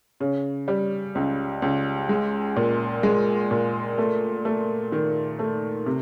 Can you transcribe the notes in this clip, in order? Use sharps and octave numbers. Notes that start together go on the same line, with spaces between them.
C#3
G3
C#2
C#2
G#3
A#2
G#3
A#2
A3
A3
D#3
A3
C3